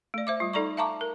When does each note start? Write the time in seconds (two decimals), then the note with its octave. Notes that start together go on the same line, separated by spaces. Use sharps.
0.14 A3 D5
0.27 C5 E5 D6
0.40 G3 F4
0.53 D#4 A4 D5 A#5 C#6
0.77 E5 F5 A5 A#5 C#6 D6
1.01 A#4